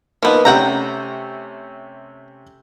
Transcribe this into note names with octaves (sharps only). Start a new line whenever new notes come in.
F3 A#3 B3 D#4 B4
C3 A3 C#4 F#5 G5 A#5